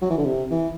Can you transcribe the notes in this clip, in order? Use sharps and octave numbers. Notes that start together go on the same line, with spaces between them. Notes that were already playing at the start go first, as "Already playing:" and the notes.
F#3
E3
D3
C3
E3